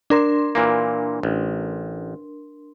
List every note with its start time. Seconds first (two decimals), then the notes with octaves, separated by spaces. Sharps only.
0.10 D4 A#4 C6
0.55 A#2 E3 A#3
1.23 A1